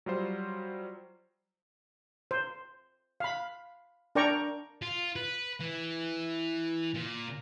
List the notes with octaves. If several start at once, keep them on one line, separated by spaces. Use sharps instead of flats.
F#3 G3 F4 C5
C5
F5 B5
D4 A#4 D5 G5 A#5 C#6
F4
B4
E3
A#2